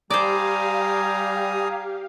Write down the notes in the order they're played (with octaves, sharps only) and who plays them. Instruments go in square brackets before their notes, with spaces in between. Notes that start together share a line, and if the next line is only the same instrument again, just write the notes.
[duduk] G3 [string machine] G4 F5 [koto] C5 D5 [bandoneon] G#5 A#5 D#6